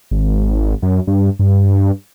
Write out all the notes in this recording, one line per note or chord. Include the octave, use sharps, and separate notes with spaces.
G#1
F#2
G2
G2